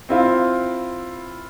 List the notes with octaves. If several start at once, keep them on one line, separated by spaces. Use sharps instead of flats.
C4 E4 F4